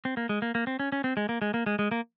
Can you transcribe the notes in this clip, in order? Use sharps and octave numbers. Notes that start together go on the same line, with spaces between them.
C4
A#3
G#3
A#3
A#3
C4
C#4
C#4
C4
G#3
A#3
G#3
A#3
G#3
G#3
A#3